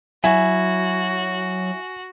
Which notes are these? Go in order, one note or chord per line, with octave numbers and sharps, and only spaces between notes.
F#3 E4 F#4 G#5